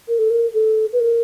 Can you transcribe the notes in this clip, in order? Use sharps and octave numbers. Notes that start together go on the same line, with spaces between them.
A#4
A4
A#4
A4
B4
A#4